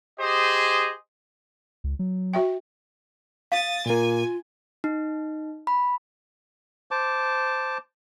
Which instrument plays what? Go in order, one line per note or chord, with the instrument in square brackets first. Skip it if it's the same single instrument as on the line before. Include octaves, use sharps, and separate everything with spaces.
[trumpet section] G4 G#4 C5 D#5
[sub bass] C#2
F#3
[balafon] F#4 E5 G5
[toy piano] F5 [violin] D#6 A6
[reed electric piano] A#2 A#3 [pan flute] F4 [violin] G#5
[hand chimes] D#4
B5
[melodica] C5 A5 D6